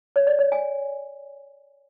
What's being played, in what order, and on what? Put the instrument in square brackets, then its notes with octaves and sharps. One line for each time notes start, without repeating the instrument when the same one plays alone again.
[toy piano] C#5
D5
C#5
G#5